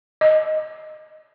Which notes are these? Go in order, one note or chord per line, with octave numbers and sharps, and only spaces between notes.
D#5